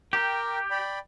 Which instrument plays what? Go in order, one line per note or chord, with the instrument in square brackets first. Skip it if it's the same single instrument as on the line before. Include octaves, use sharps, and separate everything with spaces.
[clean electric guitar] G4 [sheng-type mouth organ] A#4 G5
[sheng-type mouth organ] D5 G5 B5